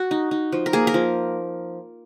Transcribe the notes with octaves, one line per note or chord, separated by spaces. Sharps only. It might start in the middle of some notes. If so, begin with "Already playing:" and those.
Already playing: F#4
D#4
D#4
F3
A#4
A#3 G#4
A#4
F3